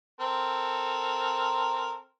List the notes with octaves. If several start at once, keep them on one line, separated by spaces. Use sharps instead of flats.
C4 A4 A#4